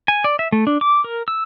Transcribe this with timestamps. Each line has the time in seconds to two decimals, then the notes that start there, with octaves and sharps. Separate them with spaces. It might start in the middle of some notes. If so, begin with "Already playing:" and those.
0.08 G#5
0.24 D5
0.39 E5
0.52 A3
0.67 D4
0.81 D6
1.04 A#4
1.28 E6